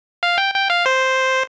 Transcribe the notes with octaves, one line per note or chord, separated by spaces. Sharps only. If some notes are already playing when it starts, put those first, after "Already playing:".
F5
G5
G5
F5
C5